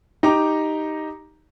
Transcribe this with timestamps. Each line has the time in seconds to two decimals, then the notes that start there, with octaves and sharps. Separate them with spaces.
0.23 D#4 G4 A#5 D6